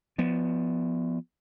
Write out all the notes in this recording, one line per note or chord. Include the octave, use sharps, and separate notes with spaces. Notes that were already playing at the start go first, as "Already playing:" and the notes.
F3 B3